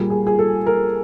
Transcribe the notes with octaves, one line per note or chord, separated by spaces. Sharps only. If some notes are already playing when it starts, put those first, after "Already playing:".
Already playing: A#2 G3 A#3 G#4
G#4
G#4
A4
A#4